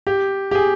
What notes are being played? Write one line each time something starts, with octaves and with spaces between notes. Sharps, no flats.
G4
G4
G#4